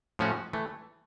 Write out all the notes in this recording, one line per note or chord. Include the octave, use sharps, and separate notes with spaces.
A2 F3 A3 C#4 F#4
E3 A3